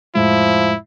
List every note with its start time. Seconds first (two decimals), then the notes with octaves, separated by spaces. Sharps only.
0.15 F2 A2 F3 G#3 E4